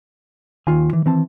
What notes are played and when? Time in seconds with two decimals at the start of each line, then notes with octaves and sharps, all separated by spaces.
0.67 D#2 D#3 F4 G#5
0.93 E3
1.06 E3 C4 A5